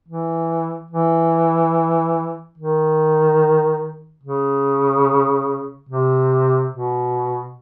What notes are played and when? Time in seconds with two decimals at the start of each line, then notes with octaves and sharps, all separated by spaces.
0.08 E3
0.91 E3
2.58 D#3
4.24 C#3
5.89 C3
6.72 B2